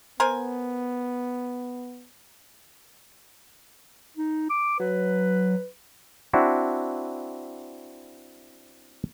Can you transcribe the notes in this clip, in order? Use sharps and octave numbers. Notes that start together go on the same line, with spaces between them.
B3 A#4 C5 G#5
D#4
D6
F#3 B4
C4 D4 E4 F#4